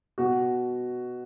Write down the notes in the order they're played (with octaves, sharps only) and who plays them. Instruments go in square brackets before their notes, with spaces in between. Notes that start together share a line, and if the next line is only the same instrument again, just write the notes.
[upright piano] B2 F#4